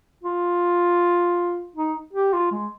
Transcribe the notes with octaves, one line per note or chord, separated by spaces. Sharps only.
F4
D#4
G4
F4
G#3